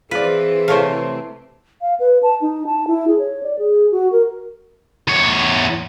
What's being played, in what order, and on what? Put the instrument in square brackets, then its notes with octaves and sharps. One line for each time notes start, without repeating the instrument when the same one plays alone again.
[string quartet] E3 C4 [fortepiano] F4 D5 [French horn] G#4 [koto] B4
[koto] C3 A3 [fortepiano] C5 C#5 F5
[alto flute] F5
B4
A5
D#4
A5
E4
G#4
C#5
D5
G#4
F#4
A#4
[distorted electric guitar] E2 C#5